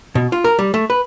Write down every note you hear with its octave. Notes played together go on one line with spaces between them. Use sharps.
B2
F4
A#4
G3
A3
B4